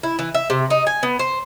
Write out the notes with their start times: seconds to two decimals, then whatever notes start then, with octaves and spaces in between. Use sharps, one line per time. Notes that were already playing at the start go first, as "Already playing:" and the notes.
0.03 E4
0.19 E3
0.35 E5
0.50 C3
0.70 D#4
0.87 G#5
1.03 B3
1.19 C5